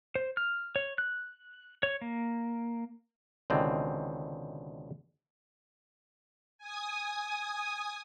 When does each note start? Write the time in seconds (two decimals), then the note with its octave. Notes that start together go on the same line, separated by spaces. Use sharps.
0.15 C5
0.37 F6
0.76 C#5
0.98 F#6
1.83 C#5
2.01 A#3
3.50 C#2 B2 D3 D#3 C4
6.58 G#5 D#6